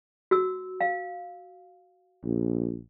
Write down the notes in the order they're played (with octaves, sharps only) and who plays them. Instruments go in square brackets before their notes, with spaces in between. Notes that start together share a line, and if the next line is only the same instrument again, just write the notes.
[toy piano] F#4 E6
F5
[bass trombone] A#1